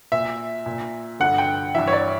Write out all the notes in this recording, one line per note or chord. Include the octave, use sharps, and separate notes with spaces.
A#2 E5
A#2
G2 D3 F#5
G5
G2 E3 E5
C#5
D5